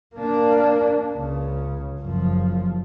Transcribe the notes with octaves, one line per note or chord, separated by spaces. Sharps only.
A#3 D4
C#2 C#3
F#1 F3